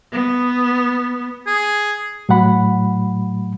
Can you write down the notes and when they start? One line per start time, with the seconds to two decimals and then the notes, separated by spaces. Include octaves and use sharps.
0.11 B3
1.47 G#4
2.29 A2 F#3 A3 F#5 B5